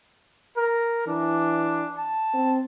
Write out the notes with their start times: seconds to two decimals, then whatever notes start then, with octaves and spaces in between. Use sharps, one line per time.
0.57 A#4
1.07 E3 D4
1.98 A5
2.34 C4